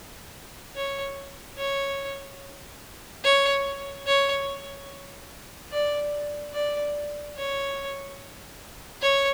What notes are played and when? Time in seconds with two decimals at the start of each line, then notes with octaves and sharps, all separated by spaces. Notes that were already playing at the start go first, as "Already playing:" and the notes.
0.76 C#5
1.58 C#5
3.24 C#5
4.06 C#5
5.72 D5
6.54 D5
7.37 C#5
9.02 C#5